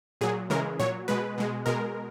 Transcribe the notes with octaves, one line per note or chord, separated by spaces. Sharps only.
A#2 F#3 G#4
C#3 E3 G#3 A#4
A#2 F#3 C#5
B2 G#3 B4
B2 G#3
B2 G#3 A#4